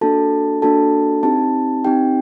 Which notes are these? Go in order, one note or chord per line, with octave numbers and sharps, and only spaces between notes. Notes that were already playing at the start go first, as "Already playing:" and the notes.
A#3 D4 F#4 A4 A5
A#3 D4 F#4 A4 A5
C4 D#4 G4 A5
C4 D#4 G4 G5